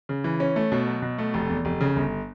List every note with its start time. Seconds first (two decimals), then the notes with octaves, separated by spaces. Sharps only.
0.09 C#3
0.24 E3
0.40 C#4
0.56 A3
0.72 B2
0.87 F#3
1.02 B2
1.18 A3
1.34 F1
1.49 E2
1.65 F1
1.81 C#3
1.96 G1